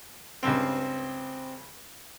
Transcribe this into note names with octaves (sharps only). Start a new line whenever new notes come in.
C#2 G2 C4 C5